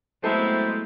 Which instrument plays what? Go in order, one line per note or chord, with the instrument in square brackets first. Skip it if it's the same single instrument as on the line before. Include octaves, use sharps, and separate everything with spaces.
[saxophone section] F#3 C4 E4 [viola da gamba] G#3 A3 B3 [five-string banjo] A4 [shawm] G5